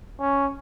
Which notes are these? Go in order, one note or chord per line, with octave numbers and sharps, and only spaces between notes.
C#4